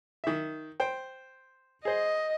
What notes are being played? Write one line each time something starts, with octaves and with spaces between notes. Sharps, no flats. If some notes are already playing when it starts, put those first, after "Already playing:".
D#3 E5
C5 G5
G#4 C5 D#5